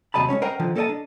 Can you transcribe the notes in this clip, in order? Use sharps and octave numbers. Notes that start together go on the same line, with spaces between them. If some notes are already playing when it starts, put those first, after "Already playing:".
D#2 C3 F#3 D#5 A5 B5
G#3 C4 C#4 C#5
A#4 C5 D#5 F#5 G5 A#5
D3 D#3 F3
A#3 A4 A#4 D5 D#5 A5
D4